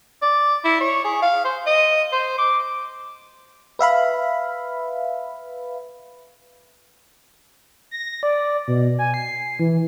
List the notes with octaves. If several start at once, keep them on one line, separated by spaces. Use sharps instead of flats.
D5
E4
C#5
G#4
F5
C5
D#5
C5
D6
B4 E5 F5 B5
A#6
D5
B2
G#5
C7
E3